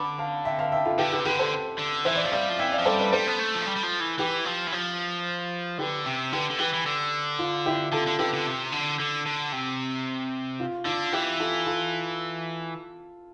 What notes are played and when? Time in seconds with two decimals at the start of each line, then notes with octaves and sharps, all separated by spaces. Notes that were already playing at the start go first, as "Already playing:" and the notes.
Already playing: D3 B5 D6
0.18 F5 A5
0.45 E5 G5
0.59 F5 A5
0.72 E5 G5
0.85 F4 A4
0.99 D3 G4 B4
1.12 G4 B4
1.20 C3
1.25 D3 G4 B4
1.39 A4 C5
1.79 D3
2.05 E3 C5 E5
2.16 D5
2.24 F3 E5
2.32 G3 D5 F5
2.49 F3
2.59 E3 E5 G5
2.72 D5 F5
2.79 F3
2.85 G3 A4 C5
2.99 B4 D5
3.12 G3 A4 C5
3.27 B3
3.39 A3
3.55 F3
3.66 G3
3.77 G3
3.84 F3
4.01 E3
4.19 E3 G4 B4
4.45 F3
4.68 E3
4.73 F3
5.79 D3 G4 B4
6.06 C3
6.33 D3 G4 B4
6.50 D3
6.59 E3 G4 B4
6.74 E3
6.86 D3
7.39 F4
7.66 E4 G4
7.92 D3 F4 A4
8.07 D3
8.19 D3 G4 B4
8.33 D3
8.46 C3
8.72 D3
9.00 D3
9.26 D3
9.53 C3
10.60 F4
10.86 D3 F4
11.13 E3 E4 G4
11.40 F4 A4
11.67 F4 A4